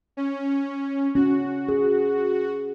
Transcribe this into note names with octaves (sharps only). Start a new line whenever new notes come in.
C#4
C#4 F#4
G#4